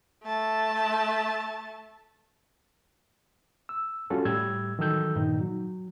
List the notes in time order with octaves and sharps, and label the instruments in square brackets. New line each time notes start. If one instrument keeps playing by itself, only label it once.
[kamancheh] A3 A5
[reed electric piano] E6
G3 C#4 F4 F#4 A4
A2 G3 E6 G#6
D#3 E3 F#3 A4 E6 G6
G2 A#2 D#3 D#4
F#3